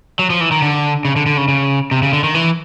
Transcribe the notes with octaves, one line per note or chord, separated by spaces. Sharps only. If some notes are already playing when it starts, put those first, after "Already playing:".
F#3
F3
E3
D#3
D3
C#3
D3
D3
C#3
C#3
C3
C#3
D3
D#3
E3